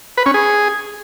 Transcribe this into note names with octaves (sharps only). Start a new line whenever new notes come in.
B4
C#4
G#4